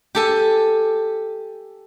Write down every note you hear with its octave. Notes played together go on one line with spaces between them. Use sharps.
G4 A4 G#5